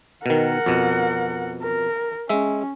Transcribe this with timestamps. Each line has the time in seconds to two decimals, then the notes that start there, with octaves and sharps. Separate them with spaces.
0.26 B2 D#3 A#4 F#5
0.66 F2 B2
1.63 A#4
2.29 G#3 C#4 E5